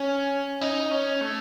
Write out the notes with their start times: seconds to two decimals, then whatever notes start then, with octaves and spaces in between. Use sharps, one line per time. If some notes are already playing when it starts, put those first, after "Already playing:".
Already playing: C#4
0.61 D#4
0.91 C#4
1.21 A3